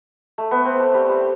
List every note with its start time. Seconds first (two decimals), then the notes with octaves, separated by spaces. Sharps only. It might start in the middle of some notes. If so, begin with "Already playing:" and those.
0.38 A3
0.51 B3
0.65 C4
0.79 A3
0.94 G3
1.09 G3